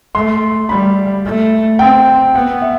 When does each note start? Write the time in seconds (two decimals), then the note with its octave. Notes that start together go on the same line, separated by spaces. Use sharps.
0.14 A3 C6
0.69 G3 B5
1.25 A3
1.79 C4 G5
2.34 B3 F#5
2.62 E5